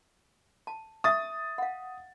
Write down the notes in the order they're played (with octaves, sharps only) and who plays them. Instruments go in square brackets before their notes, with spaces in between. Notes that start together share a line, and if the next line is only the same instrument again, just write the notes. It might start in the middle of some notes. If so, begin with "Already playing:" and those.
[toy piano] A5
[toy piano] E5 C#6 [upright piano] D#6 A6
[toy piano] F5 F#5